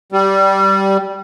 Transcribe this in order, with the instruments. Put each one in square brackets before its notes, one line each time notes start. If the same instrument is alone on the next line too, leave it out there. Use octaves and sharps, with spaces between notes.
[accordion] G3